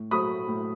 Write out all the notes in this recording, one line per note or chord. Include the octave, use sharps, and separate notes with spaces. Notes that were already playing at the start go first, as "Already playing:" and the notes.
Already playing: A2
F#3 A3 B5 D#6
A2